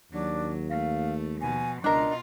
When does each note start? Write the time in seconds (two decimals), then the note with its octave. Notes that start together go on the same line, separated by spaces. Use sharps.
0.12 D#2 F#3 D4
0.70 A3 F5
1.41 B2 F3 G#5
1.84 C#2 B2 D4 F4 A#4 D#5